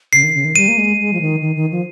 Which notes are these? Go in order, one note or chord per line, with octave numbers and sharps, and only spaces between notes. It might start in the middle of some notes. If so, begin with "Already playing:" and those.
C#3 C7
D#3
C#3
D#3
G3 D#7
A#3
G#3
G#3
F3
D#3
D#3
D#3
F3